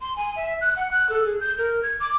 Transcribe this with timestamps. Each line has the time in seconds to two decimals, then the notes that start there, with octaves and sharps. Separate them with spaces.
0.01 C6
0.16 G#5
0.36 E5
0.61 F#6
0.76 F#5
0.91 F#6
1.09 A4
1.25 G#4
1.41 G6
1.58 A#4
1.83 G#6
2.00 D6